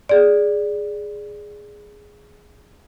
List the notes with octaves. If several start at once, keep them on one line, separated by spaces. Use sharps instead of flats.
G#4 D5